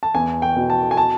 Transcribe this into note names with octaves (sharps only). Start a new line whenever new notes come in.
A5
E2 G#5
G5
B2
A5
G#5
A5